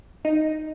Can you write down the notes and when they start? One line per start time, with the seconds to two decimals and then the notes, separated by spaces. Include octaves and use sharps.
0.25 D#4